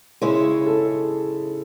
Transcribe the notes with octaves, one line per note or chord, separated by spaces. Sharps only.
C#3 G#3 C#4 E4 G#4
A4